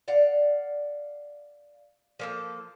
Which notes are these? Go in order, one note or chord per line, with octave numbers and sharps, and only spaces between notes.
D5 F5 F#5
F3 A#3 A4